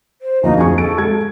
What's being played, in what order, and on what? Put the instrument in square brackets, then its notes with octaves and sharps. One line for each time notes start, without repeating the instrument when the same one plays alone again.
[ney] C5
[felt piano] D2 F3 A#3 [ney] D#4
[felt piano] F2 C#6 [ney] G#4
[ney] A4 [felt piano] D7
[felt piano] G#3 G#6